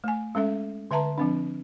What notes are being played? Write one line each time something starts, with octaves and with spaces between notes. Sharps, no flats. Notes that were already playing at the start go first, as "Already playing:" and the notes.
A3 G#5
G#3 C#4 A4 E5
D3 B4 E5 A5 A#5 C6
F3 C4 D4